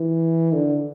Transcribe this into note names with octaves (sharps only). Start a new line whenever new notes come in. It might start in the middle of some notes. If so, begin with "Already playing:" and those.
Already playing: E3
D3